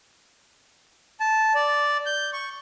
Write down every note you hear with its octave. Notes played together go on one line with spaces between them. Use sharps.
A5
D5
G6
C#6